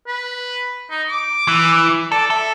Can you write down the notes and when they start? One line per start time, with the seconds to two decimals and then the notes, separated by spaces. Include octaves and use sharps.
0.07 B4
0.91 D#4
1.08 D6
1.48 E3
2.12 A4 D5
2.30 A4 E5